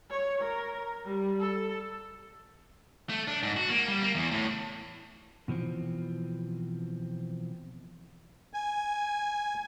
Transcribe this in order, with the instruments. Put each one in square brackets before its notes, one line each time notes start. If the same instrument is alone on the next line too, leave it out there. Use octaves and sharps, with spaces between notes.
[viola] C#5
A#4
G3
A4
[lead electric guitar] A3
D4
G#2
F#4
A#3
G3
A#3
E2
A2
[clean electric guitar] B2 E3 F3 C4
[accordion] G#5